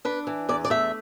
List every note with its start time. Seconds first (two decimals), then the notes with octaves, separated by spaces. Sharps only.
0.05 D4 B4
0.27 E3
0.49 E2 D5
0.65 D5
0.70 A3 E5